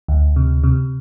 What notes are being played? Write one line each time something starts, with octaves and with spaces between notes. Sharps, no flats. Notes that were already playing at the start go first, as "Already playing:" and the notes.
D2
C3
C3